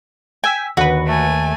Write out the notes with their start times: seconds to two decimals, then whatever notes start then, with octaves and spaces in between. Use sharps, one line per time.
0.44 G5 G#5 E6 B6
0.77 D#2 D3 F#4 B4
1.07 A3 G#5